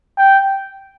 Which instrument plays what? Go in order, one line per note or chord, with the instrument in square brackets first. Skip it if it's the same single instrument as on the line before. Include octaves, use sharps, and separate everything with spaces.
[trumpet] G5